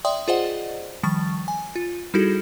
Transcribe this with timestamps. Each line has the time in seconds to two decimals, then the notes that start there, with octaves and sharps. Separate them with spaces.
0.05 D5 E5 G5 C6 D#6
0.28 F4 G#4 C5 D5 D#5 F#5
1.03 D#3 F3 G3 C#6 A6
1.48 G#5
1.76 F4
2.14 G3 D#4 E4 F#4 G#4 A4